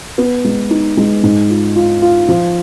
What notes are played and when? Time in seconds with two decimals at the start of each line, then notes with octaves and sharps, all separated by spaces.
0.18 B3
0.45 G#3
0.70 D#4
0.97 G#3
1.23 G#2
1.50 F4
1.76 F4
2.02 F4
2.29 F3